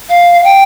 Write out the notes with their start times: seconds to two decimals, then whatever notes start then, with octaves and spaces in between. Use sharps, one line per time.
0.09 F5
0.44 G5